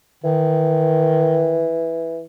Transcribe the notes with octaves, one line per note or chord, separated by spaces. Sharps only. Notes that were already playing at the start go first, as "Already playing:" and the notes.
D#3 E3